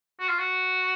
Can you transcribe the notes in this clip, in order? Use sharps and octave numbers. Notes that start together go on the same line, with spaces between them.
F#4
F4
F#4